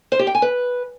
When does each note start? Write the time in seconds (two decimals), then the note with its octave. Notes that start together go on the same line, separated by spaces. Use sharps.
0.12 C5
0.19 G4
0.27 G5
0.35 G#5
0.42 B4